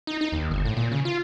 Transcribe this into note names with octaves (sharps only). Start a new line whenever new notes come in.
D#4
D#4
D#2
G1
A2
A#2
C#3
F4